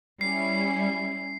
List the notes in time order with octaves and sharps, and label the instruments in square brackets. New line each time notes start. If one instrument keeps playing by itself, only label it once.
[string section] G3 C#4 E4 [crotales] C7